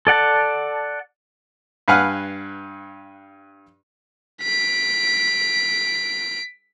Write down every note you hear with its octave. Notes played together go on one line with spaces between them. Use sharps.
A4 D5 F#5 A5
G2 B4 F5 F#5 G#5 F6
B6 D7